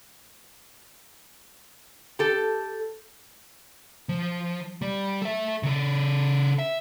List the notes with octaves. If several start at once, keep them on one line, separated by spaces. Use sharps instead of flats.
G4 A4
F3
G3
A4 E5
C#3 A4
E5